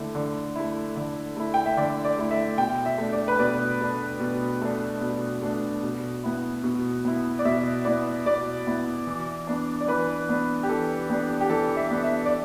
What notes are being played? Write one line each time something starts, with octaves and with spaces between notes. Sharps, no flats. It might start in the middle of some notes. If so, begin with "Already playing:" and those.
Already playing: D3 A3 E4
D3
A3 E4
D3
A3 E4
G5
E5
D3 D5
D5
A3 E4
E5
B2 G5
E5
A3 D4
D5
B4
B2 D5
A3 D4
B2
A3 D4
B2
A3 D4
B2
B3 E4
B2
B3 E4
D5
B2 E5
B3 E4 D5
B2 D5
B3 E4
E3
B3 D4
D5
E3 B4
B3 D4
G4
E3 A4
B3 D4 G4
G4
E3 A4
E5
B3 D4
E5
D5